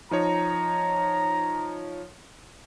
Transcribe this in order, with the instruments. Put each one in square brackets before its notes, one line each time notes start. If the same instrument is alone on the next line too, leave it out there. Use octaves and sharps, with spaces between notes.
[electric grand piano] F3 D#4 C#5 [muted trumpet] A#5